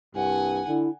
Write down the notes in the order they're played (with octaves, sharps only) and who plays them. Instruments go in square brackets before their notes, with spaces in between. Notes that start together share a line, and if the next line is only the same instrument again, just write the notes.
[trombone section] C2 G2 [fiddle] F#5 G#5
[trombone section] D3 [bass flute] E4